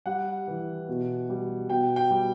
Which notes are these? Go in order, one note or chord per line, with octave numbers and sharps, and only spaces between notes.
G3 F#5
E3
B2
G3
B2 G5
G5
G3